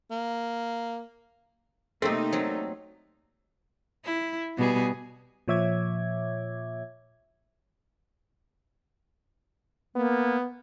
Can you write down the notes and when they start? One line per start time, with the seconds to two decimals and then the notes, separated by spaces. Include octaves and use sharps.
0.11 A#3
2.02 C3 A3 A#3 C4 D#4
2.32 F#3 C4
4.05 E4
4.57 B2 G3 G#4
5.48 A#2 F3 C#5 E5 D6 G#6
9.95 A#3 B3